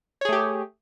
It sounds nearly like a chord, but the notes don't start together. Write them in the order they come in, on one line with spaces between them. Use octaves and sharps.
C#5 G#4 A3 G4